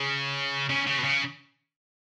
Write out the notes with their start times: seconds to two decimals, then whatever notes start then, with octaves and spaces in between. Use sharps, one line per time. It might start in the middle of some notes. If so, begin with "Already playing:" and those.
Already playing: C#3
0.69 C#3
0.87 C#3
0.98 B2
1.04 C#3